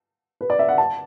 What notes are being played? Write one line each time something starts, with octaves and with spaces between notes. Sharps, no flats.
B4
D5
E5
F#5
A5